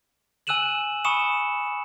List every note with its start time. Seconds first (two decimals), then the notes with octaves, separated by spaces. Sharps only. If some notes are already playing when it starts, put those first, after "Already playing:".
0.47 G#5 E6 F#6 D#7 E7 F#7
1.05 G#5 B5 C#6 D#6 C#7 E7